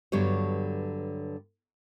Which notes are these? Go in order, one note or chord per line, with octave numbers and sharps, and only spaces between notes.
G2 D3 F#3 B3 G4 C#5